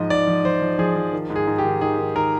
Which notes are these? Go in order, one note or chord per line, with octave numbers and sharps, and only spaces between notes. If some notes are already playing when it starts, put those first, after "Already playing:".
Already playing: G#2 F3 D#5
G#2 D5
F3
F3 C5
F3
F3 G#4
F3
D#3
G#2
G#4
G#2
G4
D#3
D#3 G#4
D#3
D#3 A#4